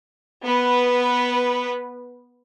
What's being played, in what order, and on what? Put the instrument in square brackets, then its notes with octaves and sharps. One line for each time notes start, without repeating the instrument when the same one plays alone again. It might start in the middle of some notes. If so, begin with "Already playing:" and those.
[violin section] B3 B4